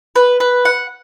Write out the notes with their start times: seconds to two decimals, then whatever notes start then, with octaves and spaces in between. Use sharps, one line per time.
0.16 B4
0.40 B4
0.65 F#5